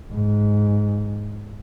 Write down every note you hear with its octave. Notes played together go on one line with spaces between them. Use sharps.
G#2